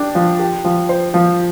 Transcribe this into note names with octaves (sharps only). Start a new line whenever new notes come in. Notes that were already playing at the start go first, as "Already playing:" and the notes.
Already playing: D4 G4
F3
G4
F3
C5
F3